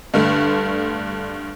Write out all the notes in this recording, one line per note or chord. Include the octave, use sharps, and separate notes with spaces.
G2 D3 A3